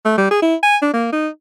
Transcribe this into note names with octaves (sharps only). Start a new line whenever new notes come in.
A3
G3
G#4
E4
G#5
D4
A#3
D#4